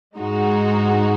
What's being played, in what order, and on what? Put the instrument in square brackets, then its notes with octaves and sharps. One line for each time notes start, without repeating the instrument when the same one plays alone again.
[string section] G#2 G#3 D#4 F#4